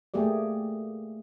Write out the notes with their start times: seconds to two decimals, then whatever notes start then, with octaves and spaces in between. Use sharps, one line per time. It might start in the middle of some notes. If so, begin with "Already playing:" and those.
0.14 A3 A#3 G4 G#4 D5